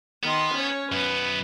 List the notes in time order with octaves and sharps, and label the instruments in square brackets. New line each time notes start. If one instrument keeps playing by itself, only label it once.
[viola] D#3 C6 [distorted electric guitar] B3
[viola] C#4 C#5
[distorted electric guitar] F#2 B3 [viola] B4